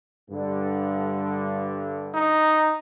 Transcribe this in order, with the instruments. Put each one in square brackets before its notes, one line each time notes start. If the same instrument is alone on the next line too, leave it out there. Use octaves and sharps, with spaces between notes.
[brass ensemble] G2 D3
[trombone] D#4